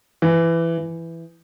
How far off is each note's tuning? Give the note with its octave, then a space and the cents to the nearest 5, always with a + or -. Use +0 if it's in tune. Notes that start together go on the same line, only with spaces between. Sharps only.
E3 +15
E3 +10